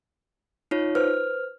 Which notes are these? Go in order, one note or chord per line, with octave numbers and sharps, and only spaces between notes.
D#4 F4 C#5
B4 C5 F6